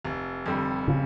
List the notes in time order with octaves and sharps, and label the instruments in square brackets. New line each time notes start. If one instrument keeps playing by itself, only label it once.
[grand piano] F1
F2 D3 G3
[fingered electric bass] C#3